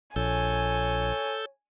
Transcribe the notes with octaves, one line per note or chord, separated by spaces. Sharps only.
A#1 A4 C#5 G#5 E6 G6